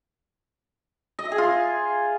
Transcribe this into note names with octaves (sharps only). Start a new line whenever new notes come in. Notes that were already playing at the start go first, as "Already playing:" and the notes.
D#5
E5
G#4
F4